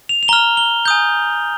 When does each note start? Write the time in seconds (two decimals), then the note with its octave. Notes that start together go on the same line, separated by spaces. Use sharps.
0.09 F7
0.23 F7
0.28 A#5 F6 G7
0.57 G7
0.86 G#5 D#6 G6